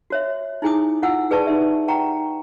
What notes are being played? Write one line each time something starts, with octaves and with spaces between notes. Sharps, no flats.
F#4 C#5 E5
D#4 E4 G#4 G#5 D6 D#6
E4 F4 F#5 G#5 E6
F#4 G#4 B4 D5 A5 C#6
D#4 G4 E5
F#5 G5 A#5 C#6